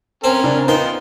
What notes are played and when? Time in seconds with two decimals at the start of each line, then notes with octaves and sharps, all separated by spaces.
0.24 C4 C#4 A#4
0.44 C#3 D4
0.68 B3 D#4 F4 A#4 C5 G5